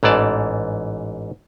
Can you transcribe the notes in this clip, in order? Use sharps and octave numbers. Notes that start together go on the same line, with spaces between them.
A1 G#2 E3 D5 A5